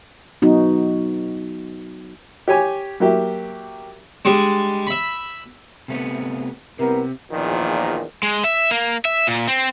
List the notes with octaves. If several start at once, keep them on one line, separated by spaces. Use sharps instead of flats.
F#3 B3 D#4 F#4
G4 C#5 G#5
F#3 A#3 G4 E5
G3 G#3 D4
E5 B5
C3 A3 B3
C2 C3 B3 A#4
A#1 E2 A#2 D#3 F3
G#3
E5
A#3
E5
A#2
C4